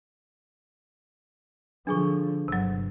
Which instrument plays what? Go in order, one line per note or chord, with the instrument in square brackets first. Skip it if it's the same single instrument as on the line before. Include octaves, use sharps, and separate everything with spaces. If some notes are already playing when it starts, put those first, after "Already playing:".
[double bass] D3 F3 [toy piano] D4 G#4 C#6
[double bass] G1 [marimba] C3 F#3